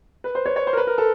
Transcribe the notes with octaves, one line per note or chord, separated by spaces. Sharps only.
B4
C5
C#5
C#5
C5
A#4
B4
A#4
A4